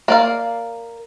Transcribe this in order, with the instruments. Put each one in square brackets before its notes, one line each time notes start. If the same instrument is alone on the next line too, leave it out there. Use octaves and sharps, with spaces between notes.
[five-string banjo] A#3 D5 F5